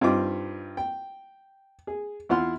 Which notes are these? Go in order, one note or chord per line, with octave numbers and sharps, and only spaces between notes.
G2 C4 D#4 F4 D6
G5
G#4
E2 E4 F4 F#5 C6 F6